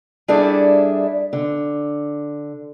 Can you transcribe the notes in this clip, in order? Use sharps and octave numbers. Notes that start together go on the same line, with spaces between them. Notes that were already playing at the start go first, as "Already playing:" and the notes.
G3 D4 E4 G#4 A4 D5
D3